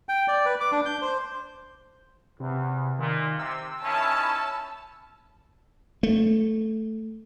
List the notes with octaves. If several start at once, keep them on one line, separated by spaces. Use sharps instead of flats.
G5
D5
B4
D6
D4
G6
C5
E2 C3
A#2 D#3
C3 E6
D#3 C#4 E4 A5
A3